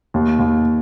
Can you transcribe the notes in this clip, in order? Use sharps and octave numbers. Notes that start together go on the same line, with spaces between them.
D#2
D#2